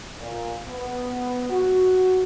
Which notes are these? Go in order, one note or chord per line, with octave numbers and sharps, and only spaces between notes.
A#2
B3
F#4